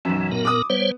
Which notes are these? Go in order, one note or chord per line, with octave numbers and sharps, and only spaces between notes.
B1 F#2 E3
A#2 B3 A#4
D6 D#6
G3 B3 C5 C#5